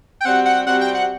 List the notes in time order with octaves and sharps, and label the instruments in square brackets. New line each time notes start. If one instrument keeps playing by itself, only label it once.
[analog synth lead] G5
[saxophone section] C3 G3 C4 F#4 [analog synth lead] F#5
[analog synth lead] F#5
[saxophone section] C3 G3 C4 F#4 [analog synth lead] F#5
[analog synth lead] G5
F#5